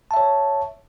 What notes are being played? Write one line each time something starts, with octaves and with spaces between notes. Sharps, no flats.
C#5 E5 A5